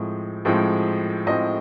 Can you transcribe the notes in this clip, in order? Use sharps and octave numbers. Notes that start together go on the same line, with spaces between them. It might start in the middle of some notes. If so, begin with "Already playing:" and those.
Already playing: A2 F3 G#3 C4
A2 F3 G#3 C4
A2 F3 G#3 C4 D#5